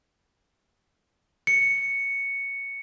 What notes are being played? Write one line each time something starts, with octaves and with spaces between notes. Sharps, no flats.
C#7